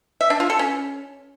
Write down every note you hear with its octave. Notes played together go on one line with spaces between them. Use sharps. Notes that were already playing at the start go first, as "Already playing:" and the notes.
E5
D4
F4
A4
C#4